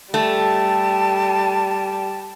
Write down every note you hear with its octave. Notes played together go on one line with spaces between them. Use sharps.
G3 A3 A5